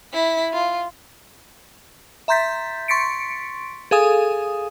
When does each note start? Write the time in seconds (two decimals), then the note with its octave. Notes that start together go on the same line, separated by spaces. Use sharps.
0.13 E4 B6
0.53 F4
2.28 E5 A#5 C6 G6 A6 B6
2.88 C6 C#6 A6 B6 C#7 D7
3.91 G#4 A4 F5 G#5 D#6